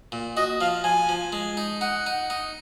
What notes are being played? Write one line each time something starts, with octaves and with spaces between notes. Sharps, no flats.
A#2
F#4 D#5
F3 F5
F3 G#5
F3
G#3
D#4
D#4 F#5
D#4
D#4